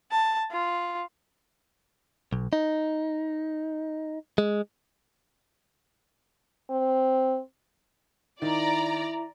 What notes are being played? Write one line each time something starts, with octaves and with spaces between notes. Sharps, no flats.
A5
F4
B1
D#4
G#3
C4
D#3 E4 D5 A#5